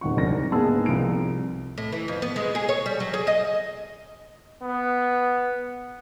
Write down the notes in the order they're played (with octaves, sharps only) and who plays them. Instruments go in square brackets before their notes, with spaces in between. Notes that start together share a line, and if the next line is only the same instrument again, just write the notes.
[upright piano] D#1 D#3 F#5 C#6
C2 F#3 D4 A#4 A#6
G#2 A#3 B3 G#4 A5 E6
C2 F3 D7
[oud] A2
E3
F2
B3
G#3
G#4
C#5
G3
F#3
G#4
D#5
[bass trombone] B3